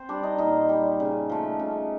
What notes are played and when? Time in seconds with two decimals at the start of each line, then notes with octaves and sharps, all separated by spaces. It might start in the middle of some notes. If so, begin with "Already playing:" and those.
Already playing: C4 C5
0.09 G3 D4 D5
0.23 D#4 D#5
0.38 A#2 D#4 D#5
0.69 G3
1.00 C#3
1.29 F3 A3
1.59 C#3